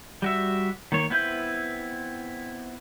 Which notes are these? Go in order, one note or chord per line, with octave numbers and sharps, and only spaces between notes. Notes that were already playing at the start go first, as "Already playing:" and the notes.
G3 F#4 E5
D#3 A#3 C#5
B3 C4 E4 B4 G6